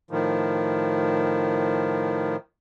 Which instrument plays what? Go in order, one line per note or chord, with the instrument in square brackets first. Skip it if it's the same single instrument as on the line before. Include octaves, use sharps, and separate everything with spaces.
[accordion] A2 D#3 F3